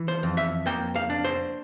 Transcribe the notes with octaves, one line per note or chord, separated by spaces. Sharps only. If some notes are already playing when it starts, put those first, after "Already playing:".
Already playing: E3
C5
F2
E5
A#3 G5
F5
D4
C5